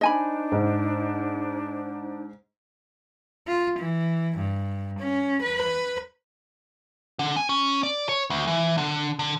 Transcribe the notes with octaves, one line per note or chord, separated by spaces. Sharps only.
D4 D#4 C5 D#5 G#5 B5
G#2
F4
E3
G2
C#4
B4
D3
G#5
C#4
D5
C#5
D2
E3
D3
D3